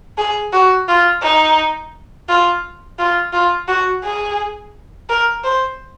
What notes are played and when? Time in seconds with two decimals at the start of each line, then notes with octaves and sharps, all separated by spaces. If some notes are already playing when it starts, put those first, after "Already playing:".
0.18 G#4
0.53 F#4
0.88 F4
1.22 D#4
2.29 F4
2.99 F4
3.33 F4
3.68 F#4
4.04 G#4
5.09 A#4
5.44 C5